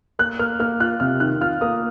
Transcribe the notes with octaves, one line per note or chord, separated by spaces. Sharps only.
A#3 F#6
A#3 F6
A#3 F6
F4 F#6
C3 F6
D#3 F#6
F4 F6
A#3 D#6